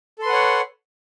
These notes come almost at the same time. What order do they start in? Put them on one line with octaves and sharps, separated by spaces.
A4 C6 B4 F#5 C#5